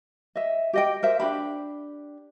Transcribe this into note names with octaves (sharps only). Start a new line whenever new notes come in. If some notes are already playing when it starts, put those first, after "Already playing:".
D#5 E5
G4 D#5 G5
A#4 C5 E5
D4 F#4 G4 B5